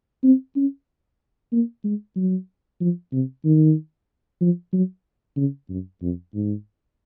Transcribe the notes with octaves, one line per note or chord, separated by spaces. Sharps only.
C4
C#4
A#3
G#3
F#3
F3
C3
D#3
F3
F#3
C#3
F#2
F2
G#2